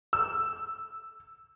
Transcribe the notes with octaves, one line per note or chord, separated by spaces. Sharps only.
E6